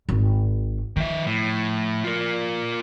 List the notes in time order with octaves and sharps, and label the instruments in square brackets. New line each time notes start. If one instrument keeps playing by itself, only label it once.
[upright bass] G#1
[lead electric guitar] D#3 E5 [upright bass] F3
[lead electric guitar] A2
F4 A#4